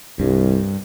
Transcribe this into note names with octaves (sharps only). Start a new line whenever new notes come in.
C2 G2